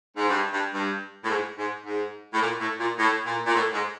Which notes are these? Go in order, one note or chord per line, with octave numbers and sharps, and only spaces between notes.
G#2
G2
G2
G2
A2
G#2
G#2
G#2
A2
A#2
A2
A#2
A2
A#2
A#2
A2
G#2